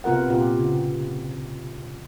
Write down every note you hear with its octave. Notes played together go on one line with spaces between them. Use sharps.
C3 B3 F4 A#4 F#5
A#2 F4 G4
C#3